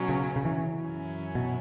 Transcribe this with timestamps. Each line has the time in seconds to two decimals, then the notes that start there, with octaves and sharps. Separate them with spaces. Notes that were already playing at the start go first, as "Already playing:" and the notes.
Already playing: B2 F#3 C#4
0.09 C#3
0.36 C#3
0.45 E3
0.82 F#2 F#3 C#4 E4
1.35 B2